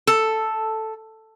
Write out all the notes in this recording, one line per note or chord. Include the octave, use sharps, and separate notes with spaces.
A4